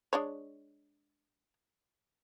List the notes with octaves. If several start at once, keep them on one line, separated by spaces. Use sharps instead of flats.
G#3 D4 C#5